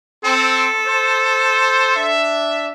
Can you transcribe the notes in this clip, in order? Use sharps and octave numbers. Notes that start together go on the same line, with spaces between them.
C4 A4
C5
D4 E5